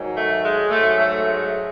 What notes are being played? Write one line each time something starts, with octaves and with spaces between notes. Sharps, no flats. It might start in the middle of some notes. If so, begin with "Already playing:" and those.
Already playing: G#2 D#3 F#3
A3
G#3
G#2 F#3 A3
A3
G#3